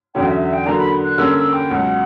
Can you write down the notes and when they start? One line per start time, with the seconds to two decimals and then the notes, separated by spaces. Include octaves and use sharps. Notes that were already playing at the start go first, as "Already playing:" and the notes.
0.15 E2 D3 F#3 C#4 G5
0.27 E5
0.41 E5
0.53 G5
0.66 D3 F#3 A#3 D4 A#5
0.79 B5
1.05 F#6
1.18 D3 G3 A#3 C#4 E6
1.35 E6
1.53 G5
1.70 C#2 B2 F#3 F#5